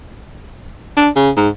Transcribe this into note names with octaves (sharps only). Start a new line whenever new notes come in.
D4
C#3
G#2